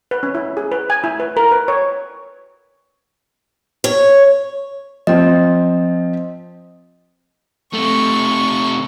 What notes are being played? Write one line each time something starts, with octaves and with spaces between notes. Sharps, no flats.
B4
C#4
E4
G#4
B4
G#5
E4
B4
A#4
B4
C#5
C#5
F3 C4 D#5
C3 A3 C#6